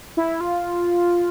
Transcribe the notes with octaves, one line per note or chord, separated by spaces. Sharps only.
E4
F4